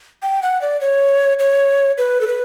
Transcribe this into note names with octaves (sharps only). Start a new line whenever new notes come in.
G5
F#5
D5
C#5
C#5
B4
A4
B4